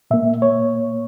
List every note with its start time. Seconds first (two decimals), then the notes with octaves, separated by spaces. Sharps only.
0.11 A#2 A#3 E5
0.42 C#5